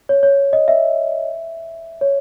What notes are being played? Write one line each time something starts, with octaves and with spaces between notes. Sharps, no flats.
C#5
C#5
D#5
E5
C#5